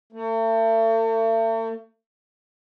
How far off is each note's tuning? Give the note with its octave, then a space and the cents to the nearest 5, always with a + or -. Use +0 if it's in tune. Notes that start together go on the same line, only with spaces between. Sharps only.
A3 +40